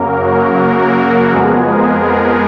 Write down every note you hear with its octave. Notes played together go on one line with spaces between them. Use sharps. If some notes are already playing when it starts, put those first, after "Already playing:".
Already playing: F#2 C#3 F#3 A#3 A#4
F#4
F2 F3 G#3 B3 G#4
A#4
A#4